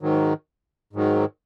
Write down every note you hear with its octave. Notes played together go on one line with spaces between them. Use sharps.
G#2 D#3 F#3
G#2 D#3 F#3